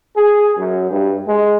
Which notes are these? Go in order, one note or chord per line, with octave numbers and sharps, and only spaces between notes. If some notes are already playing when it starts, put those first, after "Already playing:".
G#4
F#2
G2
G#3